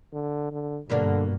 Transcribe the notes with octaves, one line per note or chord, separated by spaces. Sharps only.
D3
D3
G2 B2 D3 A#3 D4